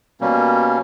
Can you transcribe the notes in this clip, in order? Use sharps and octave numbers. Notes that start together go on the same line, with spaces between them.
B2 G3 A#3 C#4